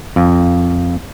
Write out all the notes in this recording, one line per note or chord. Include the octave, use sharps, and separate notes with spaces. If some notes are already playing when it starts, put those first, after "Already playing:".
F2